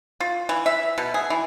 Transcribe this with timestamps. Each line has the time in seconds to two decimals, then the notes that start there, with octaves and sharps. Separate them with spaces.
0.20 F4
0.49 E3
0.66 E5
0.98 B2
1.14 G#4
1.30 E3